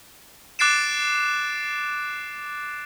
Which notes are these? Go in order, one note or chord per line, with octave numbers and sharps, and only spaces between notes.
D6 F#6 A6 C7 D7 E7